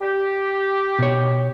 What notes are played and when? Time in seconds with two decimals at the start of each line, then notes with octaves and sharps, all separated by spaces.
0.02 G4
0.99 B2 C#5